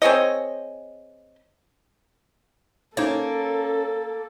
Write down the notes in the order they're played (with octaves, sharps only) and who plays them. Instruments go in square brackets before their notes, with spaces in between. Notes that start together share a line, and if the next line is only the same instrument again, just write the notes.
[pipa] C4 G#4 C#5 D#5
[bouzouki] A#3 [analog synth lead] C#4 [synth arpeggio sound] D#4 C5 C#5 [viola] A4